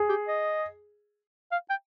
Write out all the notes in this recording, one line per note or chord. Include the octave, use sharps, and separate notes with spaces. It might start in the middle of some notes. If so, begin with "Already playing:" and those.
Already playing: G#4
G4
D#5
F5
G5